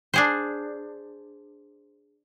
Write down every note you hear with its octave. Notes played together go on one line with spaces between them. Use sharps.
D4 G#4 C5